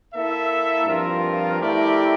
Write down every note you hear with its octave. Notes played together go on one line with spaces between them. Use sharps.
A#3 E4 A4 E5
G2 F3 C4 F4 A#4
A3 E4 G4 A#4 D5